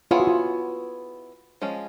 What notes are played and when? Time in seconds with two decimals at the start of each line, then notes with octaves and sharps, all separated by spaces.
0.11 B3 E4 F4 G#4 C#5
0.20 F#4
0.27 F4
1.62 F3 G#3 C#4